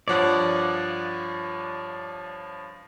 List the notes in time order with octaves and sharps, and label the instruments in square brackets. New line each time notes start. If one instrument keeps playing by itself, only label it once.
[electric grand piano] G2 F3 C#5 [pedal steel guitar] D5 F#5